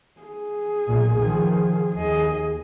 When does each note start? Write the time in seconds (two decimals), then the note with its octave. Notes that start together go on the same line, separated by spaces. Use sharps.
0.21 G#4
0.87 B1 A#2
1.18 D#3 F3
1.94 D#2 G#4 D#5